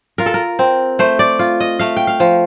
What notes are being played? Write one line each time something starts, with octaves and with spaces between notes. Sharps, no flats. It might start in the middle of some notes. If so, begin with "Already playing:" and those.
F4 A#4
A4
A#4
C4
A3 C5
D5
F4
D#5
A3 F5
G5
F5
F3